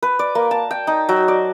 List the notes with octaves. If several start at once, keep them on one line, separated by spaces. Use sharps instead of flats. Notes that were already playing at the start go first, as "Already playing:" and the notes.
B4
D5
A#3
A5
G5
D#4
F#3
D5